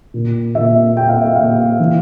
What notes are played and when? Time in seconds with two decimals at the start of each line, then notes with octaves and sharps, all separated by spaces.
0.14 A#2
0.55 A#2 E5
0.96 A#2 G5
1.09 F5
1.22 E5
1.35 A#2 F5
1.80 E3